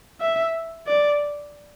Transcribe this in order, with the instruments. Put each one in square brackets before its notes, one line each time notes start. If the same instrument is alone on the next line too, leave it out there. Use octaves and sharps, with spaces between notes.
[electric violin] E5
D5